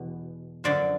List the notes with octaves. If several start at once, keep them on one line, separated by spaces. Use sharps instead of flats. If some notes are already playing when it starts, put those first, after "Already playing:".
Already playing: E2 B2
F#2 D3 F3 D5